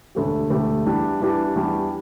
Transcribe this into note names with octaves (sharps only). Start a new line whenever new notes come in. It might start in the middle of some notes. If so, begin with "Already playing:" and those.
E1 D2 D3 A3 G4
E1 D2 D3 A3 G4
E2 E3 G3 D4 G4
E2 E3 G3 D4 G4
E2 E3 G3 D4 G4